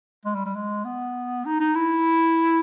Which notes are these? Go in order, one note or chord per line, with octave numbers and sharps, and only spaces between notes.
G#3
G3
G3
G#3
B3
D#4
D#4
E4